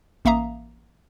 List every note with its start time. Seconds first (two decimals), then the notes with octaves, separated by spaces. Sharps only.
0.25 A1 A#3 E5 F5 A#5 D#6